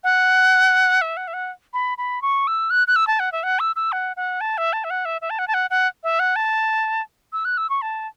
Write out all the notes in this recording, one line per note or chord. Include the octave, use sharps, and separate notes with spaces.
F#5
E5
F#5
E5
F#5
B5
B5
C#6
E6
F#6
F#6
E6
A5
F#5
E5
F#5
E6
E6
F#5
F#5
A5
E5
A5
E5
F#5
E5
E5
A5
F#5
A5
F#5
F#5
E5
F#5
A5
E6
F#6
E6
C#6
A5